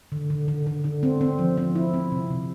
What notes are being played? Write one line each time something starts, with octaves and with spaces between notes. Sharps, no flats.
D3
D3
D3
D3
D3
C4
C4
F3
C4
E4
C4
C3
C3